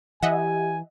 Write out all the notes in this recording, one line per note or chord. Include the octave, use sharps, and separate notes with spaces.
E3 G4 D#5 E5 F#5 G#5